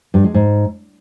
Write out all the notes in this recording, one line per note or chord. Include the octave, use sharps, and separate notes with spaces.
G2
G#3
G#2